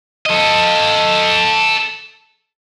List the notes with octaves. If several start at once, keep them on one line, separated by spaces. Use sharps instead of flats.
A4 D#5